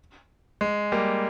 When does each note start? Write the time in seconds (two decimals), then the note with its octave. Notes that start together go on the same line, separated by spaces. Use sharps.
0.61 G#3
0.92 G3 A#3